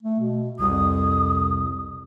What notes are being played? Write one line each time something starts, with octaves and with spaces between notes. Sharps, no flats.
A3
B2
C2 F2 D#6